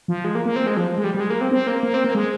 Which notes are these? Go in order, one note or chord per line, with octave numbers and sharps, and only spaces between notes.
F3
G#3
A#3
A#3
C4
G#3
F3
G#3
G3
G3
G#3
A#3
C4
C4
A#3
A#3
C4
A#3
G#3